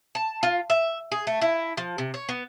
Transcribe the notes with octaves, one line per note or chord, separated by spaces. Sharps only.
A5
F4
E5
G#4
A3
E4
F3
C3
C#5
B3